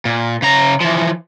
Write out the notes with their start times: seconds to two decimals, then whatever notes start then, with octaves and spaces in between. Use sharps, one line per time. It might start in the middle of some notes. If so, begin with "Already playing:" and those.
0.05 A#2
0.42 C#3 A#5
0.81 E3 F3